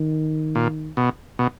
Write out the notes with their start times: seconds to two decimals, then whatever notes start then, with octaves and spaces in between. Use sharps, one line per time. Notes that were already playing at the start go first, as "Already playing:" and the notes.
Already playing: D#3
0.55 A#2
0.97 B2
1.39 B2